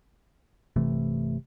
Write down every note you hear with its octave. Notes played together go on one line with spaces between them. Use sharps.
G1 C3 E3 A3